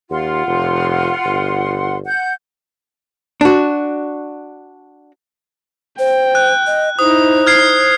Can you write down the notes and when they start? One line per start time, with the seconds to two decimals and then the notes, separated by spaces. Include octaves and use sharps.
0.10 D#2 F4 F#5 C6
0.47 F1
1.25 G1
2.05 F#5 G6
3.41 D4 F#4
5.99 C5 G5
6.35 F#6
6.67 D#5
6.99 D#4 E4 C5 D#6
7.47 F6 G#6 C7